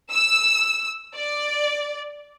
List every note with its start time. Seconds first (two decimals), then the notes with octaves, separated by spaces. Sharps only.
0.11 E6
1.15 D5